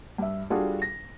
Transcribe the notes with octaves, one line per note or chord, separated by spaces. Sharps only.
G2 E5
G3 D4 F4 F#4 G#4 A4
A#6